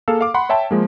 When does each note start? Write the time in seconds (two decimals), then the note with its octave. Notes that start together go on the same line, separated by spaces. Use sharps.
0.08 A#3 G#4 A4 F5 E6
0.21 F5 D6
0.34 F#5 B5 C6
0.49 C#5 E5 G5 A5
0.71 F3 G#3 A#3